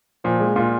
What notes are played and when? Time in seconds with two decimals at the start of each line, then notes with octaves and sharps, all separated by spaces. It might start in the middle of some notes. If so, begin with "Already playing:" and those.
0.24 A#2 F3
0.40 G#3
0.56 A#2 F4